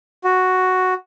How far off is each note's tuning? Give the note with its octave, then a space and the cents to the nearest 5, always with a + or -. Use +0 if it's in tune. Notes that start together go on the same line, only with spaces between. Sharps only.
F#4 +0